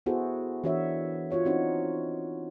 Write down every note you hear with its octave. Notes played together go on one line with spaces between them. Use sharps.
B3 E4 F#4 G#4 A4 C5
E3 D4 F#4 A#4 C#5 E5
F4 F#4 C#5 F#5
C4 D4 D#4 F#4 C5 C#5